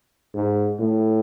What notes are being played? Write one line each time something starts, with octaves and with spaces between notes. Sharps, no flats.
G#2
A2